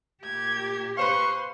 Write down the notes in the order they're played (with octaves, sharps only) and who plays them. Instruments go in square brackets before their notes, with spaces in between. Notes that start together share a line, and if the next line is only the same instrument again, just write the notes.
[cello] A#2 G4 [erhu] G#6
[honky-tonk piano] B4 C5 F5 [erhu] C6 [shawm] C#6